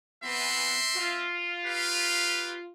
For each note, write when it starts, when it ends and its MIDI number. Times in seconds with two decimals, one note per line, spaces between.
0.23 0.77 52
0.23 0.77 59
0.23 1.28 60
0.23 1.28 76
0.23 1.28 84
0.96 2.71 65
1.66 2.56 67
1.66 2.56 71
1.66 2.56 77